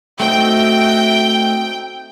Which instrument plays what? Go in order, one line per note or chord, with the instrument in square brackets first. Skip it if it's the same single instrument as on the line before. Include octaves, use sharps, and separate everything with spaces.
[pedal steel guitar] A3 C4 D#4 [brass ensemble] F#4 E5 [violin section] G5